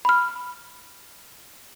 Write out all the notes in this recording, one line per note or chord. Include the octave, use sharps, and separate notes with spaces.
B5 F6